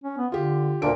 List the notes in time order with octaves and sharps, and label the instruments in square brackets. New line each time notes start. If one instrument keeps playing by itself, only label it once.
[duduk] C#4
B3
[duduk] D3 [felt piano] F4 G4
[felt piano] D#1 D7 [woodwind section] D2 A#2 [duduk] D4